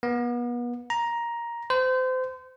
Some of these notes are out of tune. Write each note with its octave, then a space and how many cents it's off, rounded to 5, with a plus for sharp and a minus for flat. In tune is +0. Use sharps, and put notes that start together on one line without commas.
B3 -35
A#5 +10
C5 -30